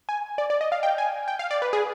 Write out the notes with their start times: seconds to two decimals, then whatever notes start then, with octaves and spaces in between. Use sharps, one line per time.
0.09 G#5
0.38 D5
0.50 D5
0.61 D#5
0.72 F5
0.83 G5
0.98 G#5
1.28 G5
1.39 F5
1.51 D5
1.62 B4
1.73 G#4